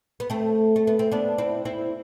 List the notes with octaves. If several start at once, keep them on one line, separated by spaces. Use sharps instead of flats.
B3
A3 C4
A3
B3
C4
B3 D4
C4 E4
C4 E4